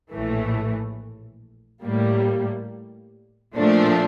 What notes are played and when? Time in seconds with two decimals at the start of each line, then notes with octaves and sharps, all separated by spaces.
0.12 A#1 A2 E3 A3
1.84 A2 G3 A#3
3.55 A#2 F3 A3 D4